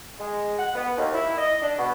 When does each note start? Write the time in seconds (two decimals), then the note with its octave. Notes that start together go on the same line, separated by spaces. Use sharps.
0.20 G#3
0.58 F#5
0.75 B3
0.97 D#2
1.14 E4
1.37 D#5
1.62 D4
1.78 B2